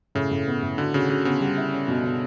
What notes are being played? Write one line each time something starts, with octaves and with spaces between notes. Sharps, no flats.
A2 C#3
A2
B3
A2
D3 F#4
C#3 F#4
C#3 F#4
C#3 B3
G3
E4
C#4
B2
B2